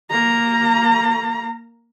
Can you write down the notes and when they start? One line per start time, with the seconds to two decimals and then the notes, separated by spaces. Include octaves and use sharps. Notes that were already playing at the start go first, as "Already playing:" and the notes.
0.10 A#3 A#5